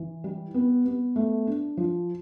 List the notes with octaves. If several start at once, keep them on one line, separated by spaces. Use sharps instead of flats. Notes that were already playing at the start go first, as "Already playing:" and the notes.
Already playing: E3
G3
B3
B3
A3
D4
F3